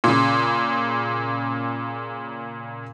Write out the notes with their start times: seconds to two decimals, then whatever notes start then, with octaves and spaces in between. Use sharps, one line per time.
0.04 A#2 C#3